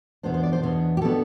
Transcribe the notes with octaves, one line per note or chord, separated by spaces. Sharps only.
E2 B2 B3 D4 C5
C5
D5
C5
E2 B2 B3 D4
G4
B2 B3 D4 A4